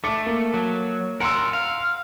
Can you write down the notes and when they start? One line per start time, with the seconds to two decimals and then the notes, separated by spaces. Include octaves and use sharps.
0.04 A3 D6 C#7
0.26 A#3
0.54 F#3
1.20 A#4 F#5 A#5 C6 E6
1.53 F5